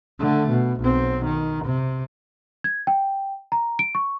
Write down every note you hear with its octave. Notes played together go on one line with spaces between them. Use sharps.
D3 A3
B2
B1 C4
D#3
C3
G#6
G5
A#5
D7
C#6